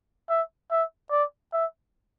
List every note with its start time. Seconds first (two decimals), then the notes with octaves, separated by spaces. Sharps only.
0.29 E5
0.71 E5
1.11 D5
1.53 E5